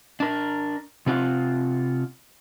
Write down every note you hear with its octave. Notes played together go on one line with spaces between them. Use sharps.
D4 A#4
C3 C4 F4 F#5